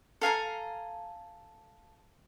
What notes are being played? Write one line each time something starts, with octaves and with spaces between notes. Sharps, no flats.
A4 F5 G#5 A#5